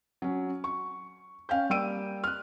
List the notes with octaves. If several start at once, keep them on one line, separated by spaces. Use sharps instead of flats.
F#3 C#4
C#6
C#4 F5 G5 G6
G3 A#3 G5 E6 D7 D#7
F6 F#6